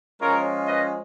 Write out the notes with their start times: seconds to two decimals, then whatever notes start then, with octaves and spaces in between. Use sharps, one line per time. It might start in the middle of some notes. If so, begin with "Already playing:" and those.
0.21 F3 G#3 C#4 F4 A#4 C#5
0.67 B4 D#5